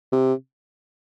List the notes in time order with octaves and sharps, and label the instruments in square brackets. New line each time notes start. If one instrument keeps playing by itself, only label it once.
[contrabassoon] C3